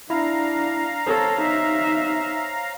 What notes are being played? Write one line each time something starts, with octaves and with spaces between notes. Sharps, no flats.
D4 E4 F5 A#5
A4 C5 C#5
D#4 E5